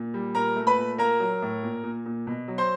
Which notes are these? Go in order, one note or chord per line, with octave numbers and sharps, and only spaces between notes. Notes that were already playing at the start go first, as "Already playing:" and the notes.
Already playing: A#2
G3
A#2 A#4 A#5
A3
B4 B5
A#2
A#3 A#4 A#5
F#3
A2
A#2
A#2
A#2
B2
F#3
C5 C6